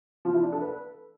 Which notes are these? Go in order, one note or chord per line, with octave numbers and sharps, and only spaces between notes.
F3
E4
D4
A4
B4